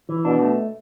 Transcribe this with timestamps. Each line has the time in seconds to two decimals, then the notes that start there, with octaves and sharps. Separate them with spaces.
0.09 E3
0.25 B2 D4
0.42 A3